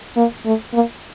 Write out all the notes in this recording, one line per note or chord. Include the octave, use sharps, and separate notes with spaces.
A#3
A3
A#3